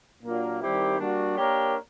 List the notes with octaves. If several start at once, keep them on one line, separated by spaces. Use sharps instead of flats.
A#2 F#3 A#3 D4 F4
D#3 G3 C4 E4 G4
G3 A#3 D4 F#4
A#3 D4 G4 A#4 C#5